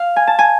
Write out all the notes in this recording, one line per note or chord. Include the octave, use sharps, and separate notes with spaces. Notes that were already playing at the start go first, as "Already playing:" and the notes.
Already playing: F5
G#5
A5
G#5